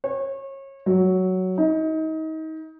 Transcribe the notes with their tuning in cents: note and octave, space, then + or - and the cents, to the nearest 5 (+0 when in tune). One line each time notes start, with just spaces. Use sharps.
C#5 -30
F#3 +5
D#4 +30